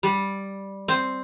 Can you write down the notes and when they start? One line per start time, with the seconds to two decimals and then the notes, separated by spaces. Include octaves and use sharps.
0.03 G3
0.88 C4